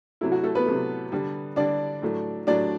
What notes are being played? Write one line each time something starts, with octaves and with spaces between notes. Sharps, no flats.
C3 F#3 A3 E4
F#4
A3 A4
B3 B4
C3 F#3 A3
D3 G3
D3 G3 D4 D5
A2 F#3 A3
A2 F#3 A3 D4 D5